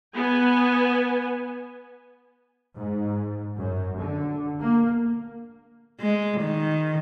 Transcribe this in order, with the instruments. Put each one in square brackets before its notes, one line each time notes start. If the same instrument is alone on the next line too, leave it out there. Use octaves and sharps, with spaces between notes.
[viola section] B3 G#5
[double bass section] G#2
F#2
D3
A#3
[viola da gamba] G#3
D#3